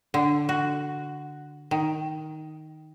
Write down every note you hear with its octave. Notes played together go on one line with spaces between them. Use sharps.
D3
F#4
D#3